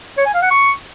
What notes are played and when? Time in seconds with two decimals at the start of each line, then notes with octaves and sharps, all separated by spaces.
0.17 C#5
0.26 G#5
0.34 F5
0.42 F#5
0.51 C#6